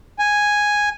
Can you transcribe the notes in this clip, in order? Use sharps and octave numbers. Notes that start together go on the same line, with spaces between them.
G#5